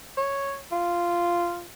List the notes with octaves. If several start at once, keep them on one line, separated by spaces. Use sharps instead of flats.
C#5
F4